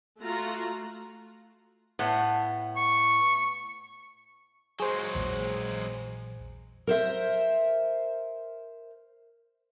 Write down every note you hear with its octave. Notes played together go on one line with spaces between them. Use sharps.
A3 F4 F#4 A#5
A2 B3
C#6
F#3 G#3 G#4 C5
A#1 E2
A#4 C5 E5